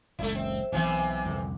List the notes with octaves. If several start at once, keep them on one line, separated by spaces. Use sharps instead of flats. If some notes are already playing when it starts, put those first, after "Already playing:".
F#1 C#2 A3 E4
C4
B1 C3 E3 C4
C2 F2 D3